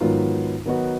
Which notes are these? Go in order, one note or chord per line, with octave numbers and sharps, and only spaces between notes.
G#2 D#3 F#3 B3 F4
D#3 F#3 B3 D#4 F#4